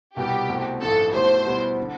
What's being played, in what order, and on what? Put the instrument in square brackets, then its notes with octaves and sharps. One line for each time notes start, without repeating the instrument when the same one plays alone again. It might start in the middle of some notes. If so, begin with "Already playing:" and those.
[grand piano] C2 B2 G3 B3 [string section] G4
[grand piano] C2 B2 A3 C4
[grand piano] A1 G2 F3 C4 [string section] A4
[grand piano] B1 B2 A3 E4 G4 [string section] C5
[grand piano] B2 G3 B3 E4
D3